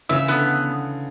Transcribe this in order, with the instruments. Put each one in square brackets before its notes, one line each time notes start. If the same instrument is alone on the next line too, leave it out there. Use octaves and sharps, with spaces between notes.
[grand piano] C#3 E3 [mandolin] E5
[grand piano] D3 [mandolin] B3